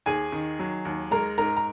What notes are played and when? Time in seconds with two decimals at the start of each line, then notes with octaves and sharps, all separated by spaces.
0.06 D#2 G#4 G#5
0.32 D#3
0.59 F#3
0.85 D#2
1.11 G#3 A#4 A#5
1.38 G#2 A#4 A#5
1.57 A#5